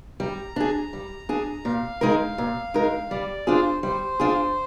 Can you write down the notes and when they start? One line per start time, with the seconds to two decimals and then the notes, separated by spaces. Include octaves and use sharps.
0.20 G3 A#5
0.56 D4 G#4
0.93 G3
1.29 D4 G#4
1.65 A#2 F5
2.01 G#3 D#4 A#4
2.38 A#2
2.74 G#3 D#4 A#4
3.11 G3 D5
3.47 D4 F4 G#4 C5
3.83 G3 C5
4.20 D4 F4 G#4